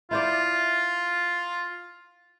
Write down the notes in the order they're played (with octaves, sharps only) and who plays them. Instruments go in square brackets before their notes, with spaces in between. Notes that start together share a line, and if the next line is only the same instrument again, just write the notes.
[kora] E4 C5 D5 [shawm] F4